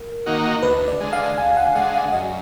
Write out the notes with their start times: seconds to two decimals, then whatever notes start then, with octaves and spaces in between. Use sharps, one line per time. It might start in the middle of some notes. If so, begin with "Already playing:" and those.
Already playing: A#4
0.26 D#3 A#3 D#4 F#4
0.63 D2 B4
0.88 D5
1.01 D3 G#3
1.13 F5
1.38 D2 G#5
1.57 F#5
1.75 D3 G#3 F#5
1.94 F5
2.12 F#2 D#5